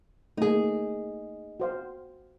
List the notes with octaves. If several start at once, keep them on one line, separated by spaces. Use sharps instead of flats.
A3 A#3 D#4 G#4
F#4 C5 F5